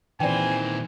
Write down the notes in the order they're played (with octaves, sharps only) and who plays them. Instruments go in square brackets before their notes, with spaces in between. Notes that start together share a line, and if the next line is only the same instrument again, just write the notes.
[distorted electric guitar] A#2 D#3 [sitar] E3 C4 [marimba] D5 G5 [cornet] G#5